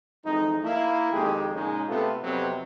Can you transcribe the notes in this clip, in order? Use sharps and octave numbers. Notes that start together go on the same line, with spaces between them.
F2 E3 G#3 D#4
A#3 E4
F2 D#3 G#3 G4 G#4
A#2 C#3 G#3 C#4 D#4
C3 A3 B3 F4 A4
F2 C3 F#3 B3 C4